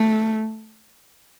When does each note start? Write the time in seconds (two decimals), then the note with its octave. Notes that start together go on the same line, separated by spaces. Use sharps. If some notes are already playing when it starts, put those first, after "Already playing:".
Already playing: A3